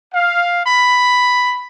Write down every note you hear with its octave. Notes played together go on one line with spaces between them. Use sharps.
F5
B5